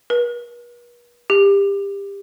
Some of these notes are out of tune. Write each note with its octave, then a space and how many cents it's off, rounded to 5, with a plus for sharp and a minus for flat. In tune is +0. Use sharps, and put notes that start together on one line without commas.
B4 -45
G4 +25